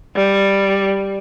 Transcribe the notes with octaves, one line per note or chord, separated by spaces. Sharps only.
G3